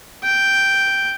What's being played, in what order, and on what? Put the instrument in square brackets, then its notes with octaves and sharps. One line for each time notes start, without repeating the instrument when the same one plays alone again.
[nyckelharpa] G5